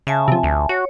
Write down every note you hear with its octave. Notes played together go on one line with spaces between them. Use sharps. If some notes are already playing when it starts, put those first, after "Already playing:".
C#3 E5 G#5 A5
C3 F3
D2
F#4 C#5